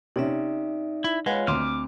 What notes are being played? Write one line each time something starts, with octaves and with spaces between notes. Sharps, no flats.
C3 C#4 D#4 D5 E5
E4
G#3 F4 B4 C#5 F5 F#5
D2 C4 C6 D6 F6